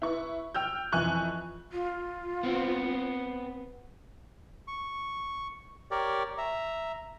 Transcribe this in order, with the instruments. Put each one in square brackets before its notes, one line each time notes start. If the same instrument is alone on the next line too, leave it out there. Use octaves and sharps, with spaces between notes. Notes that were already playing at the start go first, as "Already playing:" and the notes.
[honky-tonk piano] E4 B4 C#6
G5 E6 F6 G6
F2 E3 E4 G#5 C#6 F#6
[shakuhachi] F4
[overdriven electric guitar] B3 C4
[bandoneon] C#6
G4 A#4 C#5 D5
E5 A#5